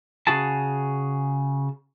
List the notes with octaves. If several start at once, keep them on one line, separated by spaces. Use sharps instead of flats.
C#3 F#4 G#4 A5